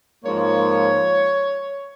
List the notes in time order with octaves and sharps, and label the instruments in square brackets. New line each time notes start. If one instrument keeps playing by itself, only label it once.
[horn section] G#2 F3 A#3 C#5